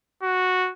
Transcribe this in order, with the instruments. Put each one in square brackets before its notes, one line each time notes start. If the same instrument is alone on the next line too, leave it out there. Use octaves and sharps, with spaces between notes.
[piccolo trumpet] F#4